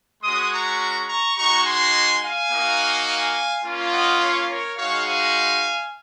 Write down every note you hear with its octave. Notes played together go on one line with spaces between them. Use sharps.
G#3 C#4 F#4 C6 D#6
A#5 C#6
A#5 C#6
G#3 D#4 F#4 A#5 C#6
G#5 C6
F5 G#5
A#3 D#4 F#4
F5 G#5
A#3 C#4 F4
D#5 F#5
C#5 F5
A#4 C#5
G#3 D#4 F#4 C#5 F5
F5 G#5